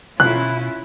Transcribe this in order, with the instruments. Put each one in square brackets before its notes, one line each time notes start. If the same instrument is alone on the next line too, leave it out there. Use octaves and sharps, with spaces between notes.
[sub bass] B2 [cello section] C#4 E4 F4 [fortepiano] F#6